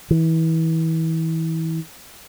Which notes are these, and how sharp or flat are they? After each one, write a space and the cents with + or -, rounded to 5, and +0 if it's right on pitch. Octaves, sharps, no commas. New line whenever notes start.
E3 -30